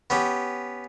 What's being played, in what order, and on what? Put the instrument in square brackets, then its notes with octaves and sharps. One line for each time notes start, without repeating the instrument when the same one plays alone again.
[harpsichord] B3 C#4 G4